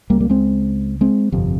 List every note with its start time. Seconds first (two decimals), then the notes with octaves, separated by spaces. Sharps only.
0.10 C#2 C#3 G3 A#3
0.20 G3 A#3
0.30 G#3 C4
1.01 G#3 C4
1.32 G1 F2 C3